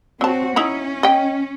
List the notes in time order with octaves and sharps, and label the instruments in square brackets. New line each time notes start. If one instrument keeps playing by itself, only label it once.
[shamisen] F#3 A5 [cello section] C4 F#4
[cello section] C#4 [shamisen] D#4 E4 A#5
[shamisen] D#5 G5